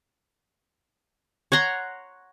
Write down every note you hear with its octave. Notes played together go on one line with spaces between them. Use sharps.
C#5 F#5 A#5 C6